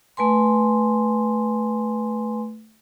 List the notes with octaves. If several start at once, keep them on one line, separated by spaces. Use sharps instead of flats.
A3 B4 G#5 C6